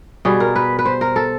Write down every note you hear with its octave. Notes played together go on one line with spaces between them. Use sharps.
B2 G3 G#4
A#4
B4
B4
C5
A#4
A4